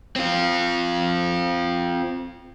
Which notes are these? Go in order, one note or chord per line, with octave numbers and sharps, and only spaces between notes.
C4 F4